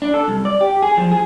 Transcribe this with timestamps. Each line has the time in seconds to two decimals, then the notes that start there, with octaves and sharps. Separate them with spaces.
0.02 D4
0.14 A4
0.28 C2
0.45 D5
0.61 G4
0.82 G#4
0.97 F3
1.12 G#4